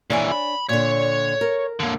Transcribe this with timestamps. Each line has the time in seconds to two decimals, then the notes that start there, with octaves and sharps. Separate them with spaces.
0.10 A#2 E3 D4 C#5 G#5
0.32 B5
0.69 A#2 D3 C#5
1.41 A#4
1.80 D3 A#3